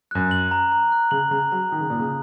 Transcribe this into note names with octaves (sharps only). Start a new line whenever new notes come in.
F#2 F#6
F#7
A#5
A#5
F#6
C#3 F#7
C#3 A#5
F#3 A#5
D#3 D#6
C#3
A#2 D#6
C#3